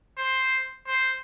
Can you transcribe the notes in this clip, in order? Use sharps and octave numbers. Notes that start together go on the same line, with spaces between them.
C5
C5